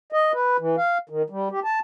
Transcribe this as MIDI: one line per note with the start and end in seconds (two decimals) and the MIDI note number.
0.12 0.32 75
0.33 0.57 71
0.59 0.76 52
0.77 0.98 77
1.09 1.22 51
1.30 1.48 55
1.51 1.60 67
1.64 1.79 81